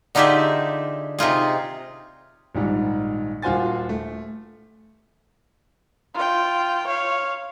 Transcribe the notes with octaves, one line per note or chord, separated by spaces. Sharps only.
D3 D#4 F4 G4 G#4 E5
C3 D#4 F4 G#4
A#1 G#2 D#3 G3
D#1 F4 F#4 C5 G#5 A6
A3
F4 G5
C#5 F5